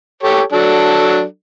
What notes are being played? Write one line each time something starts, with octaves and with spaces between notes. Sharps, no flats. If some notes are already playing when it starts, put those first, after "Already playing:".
G4 A4 C#5
F#3 D4 A4